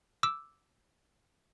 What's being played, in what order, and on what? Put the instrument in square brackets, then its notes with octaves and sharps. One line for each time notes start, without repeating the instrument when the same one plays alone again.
[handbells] D6 E6